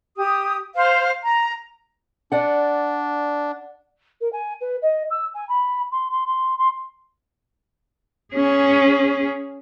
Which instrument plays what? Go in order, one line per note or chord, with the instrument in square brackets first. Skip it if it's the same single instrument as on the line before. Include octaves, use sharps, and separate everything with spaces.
[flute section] G4 D#6
C5 F5
A#5
[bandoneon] D4 [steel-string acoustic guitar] D5 F#5
[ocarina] A#4
G#5
B4
D#5
E6
G#5
B5
C6
C6
C6
C6
[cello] C#4 G#4